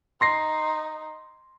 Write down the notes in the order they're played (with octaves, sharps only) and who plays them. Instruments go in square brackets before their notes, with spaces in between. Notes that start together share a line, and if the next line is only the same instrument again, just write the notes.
[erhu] D#4 [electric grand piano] C6 A#6 C7